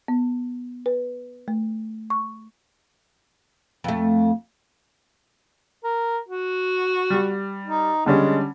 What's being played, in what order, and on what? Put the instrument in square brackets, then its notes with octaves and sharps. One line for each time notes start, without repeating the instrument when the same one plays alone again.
[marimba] B3
B4
A3
C#6
[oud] F2 A3
[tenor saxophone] A#4
F#4
[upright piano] G3
[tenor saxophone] D#4
[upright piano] D3 G3 C#4 [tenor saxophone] G#3